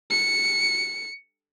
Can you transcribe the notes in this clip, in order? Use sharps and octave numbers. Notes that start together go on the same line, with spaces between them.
C#7